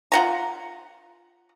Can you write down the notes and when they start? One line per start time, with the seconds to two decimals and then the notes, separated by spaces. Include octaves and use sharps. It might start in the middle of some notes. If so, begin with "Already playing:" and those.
0.12 F4 F#5 A#5